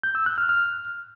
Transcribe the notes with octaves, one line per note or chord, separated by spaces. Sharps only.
G6
E6
F#6
F6
F6